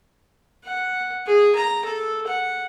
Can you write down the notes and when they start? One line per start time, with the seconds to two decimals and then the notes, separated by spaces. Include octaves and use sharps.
0.64 F#5
1.26 G#4
1.55 A#5
1.85 A4
2.27 F#5